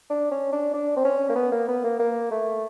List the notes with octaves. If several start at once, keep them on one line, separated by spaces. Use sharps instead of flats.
D4
C#4
D4
D4
C4
C#4
A#3
B3
A#3
B3
A#3
A#3
A3